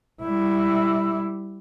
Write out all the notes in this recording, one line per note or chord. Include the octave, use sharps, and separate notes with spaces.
G3 E4